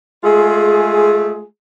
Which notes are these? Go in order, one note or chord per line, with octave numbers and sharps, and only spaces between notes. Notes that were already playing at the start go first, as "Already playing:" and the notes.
G#3 A3 F4 G#4